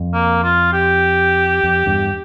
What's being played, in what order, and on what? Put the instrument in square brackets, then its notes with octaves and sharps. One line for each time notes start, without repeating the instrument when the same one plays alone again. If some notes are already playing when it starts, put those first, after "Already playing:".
Already playing: [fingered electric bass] F2
[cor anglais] A#3
F4
G4
[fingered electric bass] F2
E2 G2